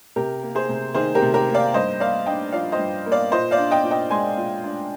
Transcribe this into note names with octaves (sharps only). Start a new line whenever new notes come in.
C3 G4 A#4
A#3
G#4 C5
C3
D#3 G#4 C5
G4 A#4
C3
G4 A#4
A#3
D5 F5
G2 C5 D#5
A#3 D5 F5
D4 D#5 G5
F3 D5 F5
C5 D#5
G2
A#3
D5 F5
A#2 C5 D#5
D5 F5
D4
D#5 G5
A#2
D#5 G5
G#3 G#5 C6
A#2
D4